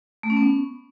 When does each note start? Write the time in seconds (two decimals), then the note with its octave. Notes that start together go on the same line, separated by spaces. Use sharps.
0.23 A3
0.30 C#4
0.36 B3